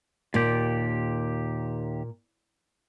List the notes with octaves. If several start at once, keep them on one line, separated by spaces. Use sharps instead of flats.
D#2 A#2 G4